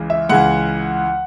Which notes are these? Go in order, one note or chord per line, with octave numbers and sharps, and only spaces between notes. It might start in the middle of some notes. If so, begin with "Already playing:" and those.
Already playing: C#2 C#3 E3
E5
C#2 C#3 E3 F#5